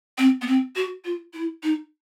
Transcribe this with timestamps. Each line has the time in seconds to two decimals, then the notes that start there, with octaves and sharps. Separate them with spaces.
0.18 C4
0.42 B3
0.47 C4
0.76 F#4
1.05 F4
1.33 E4
1.63 D#4